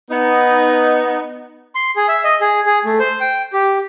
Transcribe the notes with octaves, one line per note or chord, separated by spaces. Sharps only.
B3 D#4
C6
G#4
E5
D#5
G#4
G#4
A3
C5
G5
G4